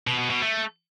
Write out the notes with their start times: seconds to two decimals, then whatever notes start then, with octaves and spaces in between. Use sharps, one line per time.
0.07 B2
0.19 B2
0.30 B2
0.42 A3